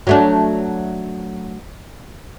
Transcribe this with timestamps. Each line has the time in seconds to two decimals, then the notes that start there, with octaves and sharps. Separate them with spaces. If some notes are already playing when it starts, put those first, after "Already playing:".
0.07 F#3 A3 D4